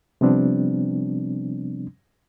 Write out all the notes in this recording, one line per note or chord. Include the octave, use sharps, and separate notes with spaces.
C3 F3 G3 B3 C4 D4